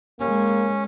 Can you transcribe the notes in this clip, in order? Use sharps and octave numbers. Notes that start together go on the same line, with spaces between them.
G#3 A#3 C#4